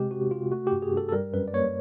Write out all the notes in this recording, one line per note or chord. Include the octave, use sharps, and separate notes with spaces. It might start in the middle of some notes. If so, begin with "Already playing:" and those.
Already playing: C3 G#3 G4
C3 F#4
C3 F4
A3 F#4
G2 G4
G#4
G2
A4
A4
G3 A#4
F#2 B4
D5
A#3 C#5